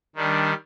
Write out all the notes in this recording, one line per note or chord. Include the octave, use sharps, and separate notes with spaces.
D#3 G3 D4